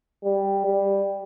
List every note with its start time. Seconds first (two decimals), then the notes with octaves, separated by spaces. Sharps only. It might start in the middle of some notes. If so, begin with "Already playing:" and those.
0.24 G3
0.65 G3